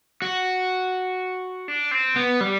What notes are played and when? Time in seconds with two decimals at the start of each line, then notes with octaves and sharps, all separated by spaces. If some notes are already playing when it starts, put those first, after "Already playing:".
0.22 F#4
1.68 D4
1.91 C4
2.16 B3
2.40 G3